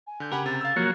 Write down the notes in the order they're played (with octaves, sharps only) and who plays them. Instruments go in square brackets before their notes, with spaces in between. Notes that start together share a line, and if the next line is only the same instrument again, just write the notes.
[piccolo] G#5
[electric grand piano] D3 G6
[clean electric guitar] C#3 A#4 [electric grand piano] G4 F#5 G#5 [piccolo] B5
[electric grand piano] C3 [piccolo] A6
[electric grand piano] F5 E6
[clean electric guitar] F3 F#3 [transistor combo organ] A#3 F#4 C#5 [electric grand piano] C7